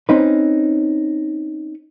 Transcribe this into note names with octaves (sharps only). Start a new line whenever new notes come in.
C4 C#4 D#4 B4